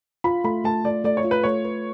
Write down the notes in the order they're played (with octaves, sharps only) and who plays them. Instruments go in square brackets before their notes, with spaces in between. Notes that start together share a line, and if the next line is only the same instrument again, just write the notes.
[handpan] F4 [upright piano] B5
[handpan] A3 [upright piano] B5
[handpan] A3 [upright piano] A5
[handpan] A3 [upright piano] D5
[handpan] A3 [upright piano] D5
[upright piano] C#5
[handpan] F4
[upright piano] B4
[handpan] A3 [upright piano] C#5
[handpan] B4